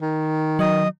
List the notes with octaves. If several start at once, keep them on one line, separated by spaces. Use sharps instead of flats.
D#3
F#3 D#5